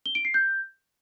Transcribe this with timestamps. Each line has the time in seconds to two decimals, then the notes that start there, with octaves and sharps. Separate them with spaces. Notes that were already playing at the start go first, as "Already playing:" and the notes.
0.06 G7
0.15 D7
0.25 C7
0.34 G6